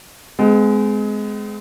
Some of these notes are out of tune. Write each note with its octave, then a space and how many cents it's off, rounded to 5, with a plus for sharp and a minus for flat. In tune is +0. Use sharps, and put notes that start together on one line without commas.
G#3 +15 C4 -45